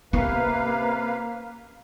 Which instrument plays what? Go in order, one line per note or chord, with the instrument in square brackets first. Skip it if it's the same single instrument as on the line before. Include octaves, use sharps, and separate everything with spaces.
[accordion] C3 B4 F5 [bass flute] A#3 [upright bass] C#4